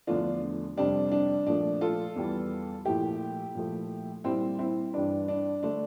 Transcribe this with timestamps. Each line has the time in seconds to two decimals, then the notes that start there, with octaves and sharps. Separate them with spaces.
0.07 E2 D3 F3 A3 D4 F4
0.77 F2 C3 G3 D4
1.12 D4
1.47 A#2 F3 A3 D4
1.81 F4 A4
2.16 E2 E3 G3
2.85 A#2 F3 A3 E4 G4
3.55 A#2 F3 A3
4.24 A#2 G3 C4 E4
4.59 C4 E4
4.94 G2 E3 G3 D4
5.28 D4
5.63 D3 A3 D4